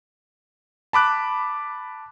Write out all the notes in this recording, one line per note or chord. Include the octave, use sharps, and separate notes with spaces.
A5 B5 D6 F#6